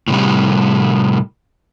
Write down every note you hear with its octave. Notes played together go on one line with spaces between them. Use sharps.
A2 C3 G3